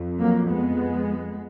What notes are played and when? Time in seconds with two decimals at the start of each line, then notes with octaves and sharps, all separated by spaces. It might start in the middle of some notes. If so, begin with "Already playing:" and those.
Already playing: F2
0.19 F#3 A#3
0.50 G#3 B3